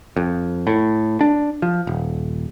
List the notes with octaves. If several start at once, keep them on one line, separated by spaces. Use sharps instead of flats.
F2
A2
D4
F3
D#1